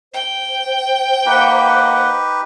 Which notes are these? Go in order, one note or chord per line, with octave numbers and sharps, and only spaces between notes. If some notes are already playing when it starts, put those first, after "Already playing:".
C5 G5
A#3 D#4 G4 B4 F#5